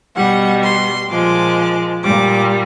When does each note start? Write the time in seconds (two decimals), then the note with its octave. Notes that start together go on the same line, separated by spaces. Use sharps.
0.16 B2 G3 F#5
0.63 C6
1.10 A#2 F3 G#3 D6
2.04 A#2 G3 D6